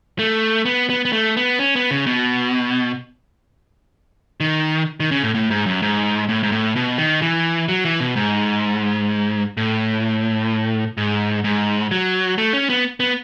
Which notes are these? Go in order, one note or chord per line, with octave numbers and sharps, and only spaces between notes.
A3
B3
B3
B3
A3
B3
C#4
B3
C#3
B2
D#3
D#3
C#3
A2
A2
G#2
F#2
G#2
A2
G#2
A2
B2
D#3
E3
F#3
E3
B2
G#2
A2
G#2
G#2
F#3
A3
C#4
B3
B3